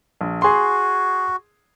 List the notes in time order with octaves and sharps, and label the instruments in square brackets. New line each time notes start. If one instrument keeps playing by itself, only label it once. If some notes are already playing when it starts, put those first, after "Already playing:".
[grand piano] A#1
[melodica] F#4 [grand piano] G#4 C6